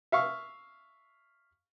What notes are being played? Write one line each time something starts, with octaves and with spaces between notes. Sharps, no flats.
E5 F5 C#6